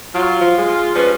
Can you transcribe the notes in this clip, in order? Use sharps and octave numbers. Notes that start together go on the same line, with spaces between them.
F#3 F4
F3
G#3
F3 G3 C#4 B4